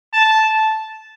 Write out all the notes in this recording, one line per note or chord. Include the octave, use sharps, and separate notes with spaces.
A5